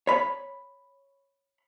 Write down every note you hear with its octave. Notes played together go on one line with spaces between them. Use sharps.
C#5 B5